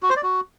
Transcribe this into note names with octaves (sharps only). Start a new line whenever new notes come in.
F#4
C5
D5
F#4